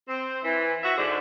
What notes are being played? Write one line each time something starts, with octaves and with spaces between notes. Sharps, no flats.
C4
E3
F#4 E5
G#2 D3